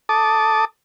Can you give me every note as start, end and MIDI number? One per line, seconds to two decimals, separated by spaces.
0.09 0.65 69
0.09 0.65 81
0.09 0.65 86
0.09 0.65 87